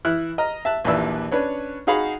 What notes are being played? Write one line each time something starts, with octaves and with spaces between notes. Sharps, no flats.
E3 E4 F6 F#6
D#5 A#5 F6
E5 A5 F#6
A#1 D#2 E3 B4 D5 E6
C#4 D4 B4 C#5
D#4 F#4 G#4 F5 F#5 B5